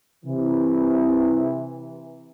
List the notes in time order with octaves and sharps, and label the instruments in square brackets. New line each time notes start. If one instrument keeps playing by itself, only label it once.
[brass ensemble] C3 E3